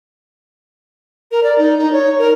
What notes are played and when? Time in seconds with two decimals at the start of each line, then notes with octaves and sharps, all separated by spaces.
1.31 A#4
1.43 D5
1.58 D#4
1.79 D#4
1.93 C#5
2.19 A#4